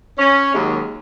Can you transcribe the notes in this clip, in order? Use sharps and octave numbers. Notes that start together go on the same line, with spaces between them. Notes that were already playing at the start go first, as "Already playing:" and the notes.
C#4
D#2 D#3 F#3 G#3